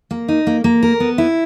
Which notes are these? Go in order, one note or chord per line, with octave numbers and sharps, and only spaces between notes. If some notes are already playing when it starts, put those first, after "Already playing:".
A#3
D#4
A#3
A#3
A#4
B3
E4